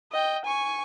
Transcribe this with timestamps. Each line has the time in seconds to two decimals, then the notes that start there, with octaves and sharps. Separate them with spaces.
0.12 D#5 G5
0.45 G#5 C#6